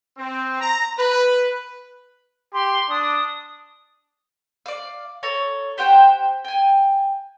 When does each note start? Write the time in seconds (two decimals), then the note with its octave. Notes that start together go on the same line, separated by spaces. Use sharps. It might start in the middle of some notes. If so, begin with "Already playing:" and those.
0.17 C4
0.60 A#5
0.98 B4
2.53 G4 C6
2.90 D4 D#6
4.66 D5 F5
5.23 A4 C#5 A#5
5.78 G4 C5 F#5 G5
6.44 G5 G#5